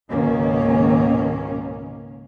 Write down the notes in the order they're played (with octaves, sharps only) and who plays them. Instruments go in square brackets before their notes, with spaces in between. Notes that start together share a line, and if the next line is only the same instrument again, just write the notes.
[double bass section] C#2 G#2 B2 D#3 A#3 C#4